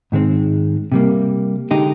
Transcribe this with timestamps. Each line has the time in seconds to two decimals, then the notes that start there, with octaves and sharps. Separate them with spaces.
0.12 G#2 D#3 G#3 C4
0.92 C3 G3 A#3
1.71 D3 G#3 D#4 G4